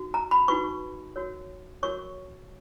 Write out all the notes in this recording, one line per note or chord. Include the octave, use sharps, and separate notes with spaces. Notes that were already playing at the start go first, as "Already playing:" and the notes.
Already playing: D#4 F#4
A#5
B5
D#4 F#4 B4 C#6
F#4 A#4 C#5
F#4 A#4 C#5 C#6